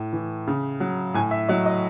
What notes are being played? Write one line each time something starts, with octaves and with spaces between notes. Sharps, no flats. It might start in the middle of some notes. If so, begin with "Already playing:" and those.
Already playing: A2
E3
C#3
F#3
A2 G#5
E5
F#3 D#5
D#5